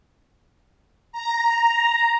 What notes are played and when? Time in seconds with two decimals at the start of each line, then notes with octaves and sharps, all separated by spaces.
1.12 A#5